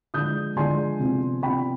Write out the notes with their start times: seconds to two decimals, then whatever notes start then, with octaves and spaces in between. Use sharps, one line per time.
0.14 D3 F3 G#3 D4 D#6 G6
0.56 D3 F3 G#3 D4 G#5 C6
0.99 C3 F3 B3 D4
1.42 C3 F3 B3 D4 G5 B5